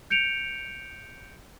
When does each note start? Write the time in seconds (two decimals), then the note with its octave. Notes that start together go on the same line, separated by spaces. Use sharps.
0.10 G6 C#7 D7 F7